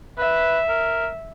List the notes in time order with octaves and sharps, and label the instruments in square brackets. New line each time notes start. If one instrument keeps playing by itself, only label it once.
[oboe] B4 [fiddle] E5
[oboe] A#4